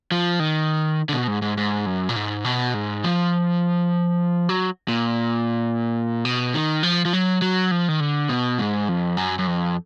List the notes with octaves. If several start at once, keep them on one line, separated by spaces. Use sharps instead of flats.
F3
D#3
D3
B2
G#2
G#2
G#2
F#2
A#2
G#2
B2
G#2
F3
F#3
A#2
B2
D#3
F3
F3
F#3
F#3
F3
D#3
D3
B2
G#2
F2
F#2
F#2
F2